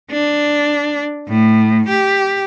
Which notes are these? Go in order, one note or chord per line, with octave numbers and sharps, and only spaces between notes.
D4
A2
G4